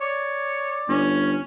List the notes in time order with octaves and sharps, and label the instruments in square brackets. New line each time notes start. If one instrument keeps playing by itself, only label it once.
[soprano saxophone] C#5 [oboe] D5
[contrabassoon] G1 [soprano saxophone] C#4